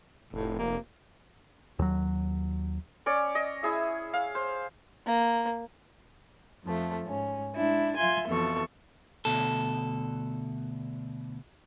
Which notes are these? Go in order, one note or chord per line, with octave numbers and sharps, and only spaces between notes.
F1 A2
A#3
D#2 F#3
C#4 C#5 D5
D#5
E4 G#4 E5
F5
C5
A#3
F2 F3 A3
G#2 C#4
G#3 D4 E4
F4 E5 G#5 C6
F2 B2 E3 F3 A4 C#6
D2 B2 A4